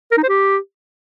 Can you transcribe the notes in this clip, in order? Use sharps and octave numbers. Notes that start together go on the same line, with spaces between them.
A#4
D#4
C5
G4